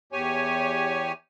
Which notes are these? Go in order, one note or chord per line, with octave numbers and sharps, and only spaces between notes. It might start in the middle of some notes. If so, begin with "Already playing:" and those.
E2 G4 C#5 G#5